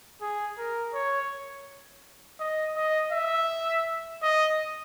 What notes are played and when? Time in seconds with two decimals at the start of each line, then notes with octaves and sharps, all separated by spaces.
0.21 G#4
0.58 A#4
0.94 C#5
2.40 D#5
2.76 D#5
3.12 E5
4.22 D#5